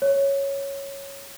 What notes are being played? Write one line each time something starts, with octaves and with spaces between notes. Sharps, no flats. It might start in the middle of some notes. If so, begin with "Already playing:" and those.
C#5